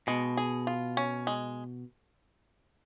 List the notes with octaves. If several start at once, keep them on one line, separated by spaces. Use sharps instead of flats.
B2 G#3
G#4
F4
C#4
G#3